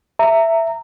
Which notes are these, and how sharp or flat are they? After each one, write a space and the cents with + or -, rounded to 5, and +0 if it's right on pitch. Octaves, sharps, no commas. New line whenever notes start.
E5 +5 A#5 -25